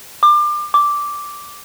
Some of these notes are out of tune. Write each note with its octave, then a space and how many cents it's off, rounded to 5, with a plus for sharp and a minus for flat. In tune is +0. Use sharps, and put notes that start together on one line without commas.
D6 +30
D6 -5